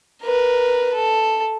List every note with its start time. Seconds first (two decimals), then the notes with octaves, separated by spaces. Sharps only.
0.23 A#4 B4
0.94 A4